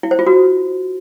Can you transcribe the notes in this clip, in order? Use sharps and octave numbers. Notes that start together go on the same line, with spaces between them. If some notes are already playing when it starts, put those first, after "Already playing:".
E4
C5
F4
F#4